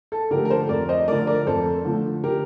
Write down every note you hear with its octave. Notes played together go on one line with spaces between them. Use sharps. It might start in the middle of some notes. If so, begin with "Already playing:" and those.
A4
D3 F3 A3 G4 A#4
A#4
A4 C5
F2 A#4 D5
C5 D#5
D3 F3 A3 A#4 D5
A#4 D5
F2 A4 C5
D3 F3 A3
D3 G4 A#4